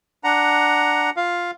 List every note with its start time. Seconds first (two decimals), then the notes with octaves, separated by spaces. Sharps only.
0.24 D4 F#5 A#5
1.17 F4 F5